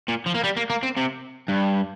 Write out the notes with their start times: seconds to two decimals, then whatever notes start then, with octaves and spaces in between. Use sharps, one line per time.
0.08 A#2
0.26 F3
0.34 A#3
0.43 G3
0.57 A#3
0.70 A#3
0.83 C4
0.97 C3
1.49 G2